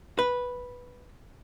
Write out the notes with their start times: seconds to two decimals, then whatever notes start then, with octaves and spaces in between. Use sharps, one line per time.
0.19 B4